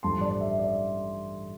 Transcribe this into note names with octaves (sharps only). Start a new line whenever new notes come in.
A1 G2 F3 A3 A5 C6
D5
E5
D5